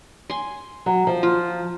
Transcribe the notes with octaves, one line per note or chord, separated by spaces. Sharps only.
G#5 C6
F#3
F3
F4